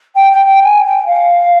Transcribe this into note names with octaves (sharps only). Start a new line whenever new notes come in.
G5
G5
G5
G#5
G5
F5